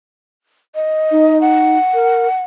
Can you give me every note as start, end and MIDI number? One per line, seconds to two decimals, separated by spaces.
0.75 1.40 75
1.11 1.78 63
1.41 2.43 78
1.94 2.28 70